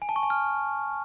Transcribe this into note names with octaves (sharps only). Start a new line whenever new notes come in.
G#5
A5
C#6
G#5
F6